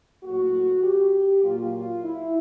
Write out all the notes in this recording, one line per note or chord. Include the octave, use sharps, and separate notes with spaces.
A2 F#3 A#3 F#4
G4
A#2 F#3 A#3 F4
F4
E4